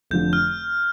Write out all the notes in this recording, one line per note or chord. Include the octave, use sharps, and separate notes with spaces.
F1 F2 D3 F3 G6
F6